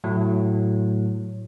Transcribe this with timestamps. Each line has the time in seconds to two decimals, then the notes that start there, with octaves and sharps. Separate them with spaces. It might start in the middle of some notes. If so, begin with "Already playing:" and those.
0.04 A2 F#3 A3